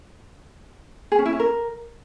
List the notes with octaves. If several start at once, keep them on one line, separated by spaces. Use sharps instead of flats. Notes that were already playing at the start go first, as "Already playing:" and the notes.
G#4
C#4
E4
C#4
A#4